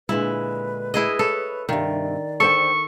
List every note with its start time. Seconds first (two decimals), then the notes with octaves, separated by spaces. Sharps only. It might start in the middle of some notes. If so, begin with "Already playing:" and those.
0.09 A#2 D3 G#3 E4 B4
0.94 E4 G#4 D#5
1.19 A4 C#5
1.69 G2 C3 D#3 D5
2.40 D2 A4 C5 G5 C#6